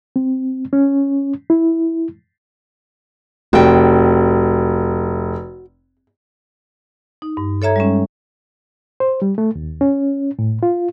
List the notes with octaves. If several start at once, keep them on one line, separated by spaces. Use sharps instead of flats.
C4
C#4
E4
F1 F#4 G5
D#4
G2
A4 C#5 E5 A#5 G#6
G3 G#3 C#4
C5
G3
A3
D#2
C#4
A2
F4